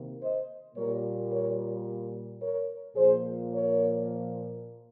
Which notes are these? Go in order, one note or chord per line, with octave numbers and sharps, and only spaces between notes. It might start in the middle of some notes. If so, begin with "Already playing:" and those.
Already playing: C3 D#3 A#3
C5 D#5
A#2 G3 A#3 A#4 C#5
A#4 C#5
A#4 C#5
A#2 F3 A#3 G#4 C5
A#4 C#5